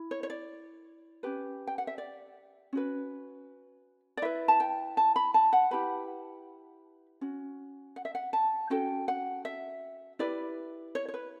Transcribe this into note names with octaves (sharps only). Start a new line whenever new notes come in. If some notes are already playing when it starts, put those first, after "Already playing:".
Already playing: E4
C#5
C#5
D5
C#4 G4 B4
G5
F#5
E5
D5
C#4 F#4 B4
D5
E4 B4 E5
A5
G5
A5
B5
A5
F#5
E4 G4 B4 B5
C#4 F#4
F#5
E5
F#5
A5
C#4 F#4 A4 G5
F#5
E5
E4 G4 B4 D5
C#5
C#5
B4